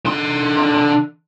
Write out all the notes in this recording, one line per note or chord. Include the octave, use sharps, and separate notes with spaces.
D3 C6